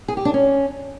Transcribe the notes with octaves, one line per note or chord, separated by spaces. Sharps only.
G#4
G4
D4
C#4